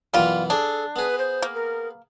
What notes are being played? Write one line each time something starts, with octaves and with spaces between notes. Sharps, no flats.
F#2 B2 E3 G3 F4
D4 G#4 A4
B3 G#4 B4
C5
A#3
A#4